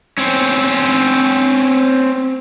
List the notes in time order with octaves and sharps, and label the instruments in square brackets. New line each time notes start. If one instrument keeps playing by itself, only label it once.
[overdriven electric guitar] C4 C#4